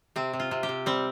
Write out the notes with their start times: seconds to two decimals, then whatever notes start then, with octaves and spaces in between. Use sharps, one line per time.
0.16 C3 C4
0.33 C3
0.40 F4
0.51 C3
0.63 G4
0.69 C3
0.86 G3 C4